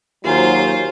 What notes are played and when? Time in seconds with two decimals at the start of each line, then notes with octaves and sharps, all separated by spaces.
0.25 D#2 F#3 F4 G4 C5 G#5 A#5